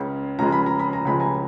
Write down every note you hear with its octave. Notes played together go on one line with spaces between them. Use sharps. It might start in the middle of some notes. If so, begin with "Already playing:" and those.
Already playing: C#2 C#3 G#3
C#2 C#3 F3 G#3 A#5
B5
A#5
B5
A#5
C#2 C#3 F3 G#3 B5
G#5 A#5